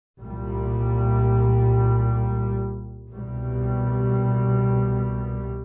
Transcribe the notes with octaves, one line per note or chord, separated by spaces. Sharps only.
C2 A#2 G3
C2 B2 G3